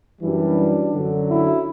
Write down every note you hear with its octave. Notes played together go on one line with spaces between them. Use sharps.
F#2 E3 G3 D4
F#2 D3 F#3
E4